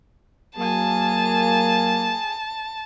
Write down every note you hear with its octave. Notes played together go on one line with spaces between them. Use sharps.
F#3 A#3 G#4 G#5 A5